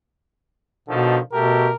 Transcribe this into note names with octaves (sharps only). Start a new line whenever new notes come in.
B2 D3 D#3 F3
B2 A3 F#4 G4 A#4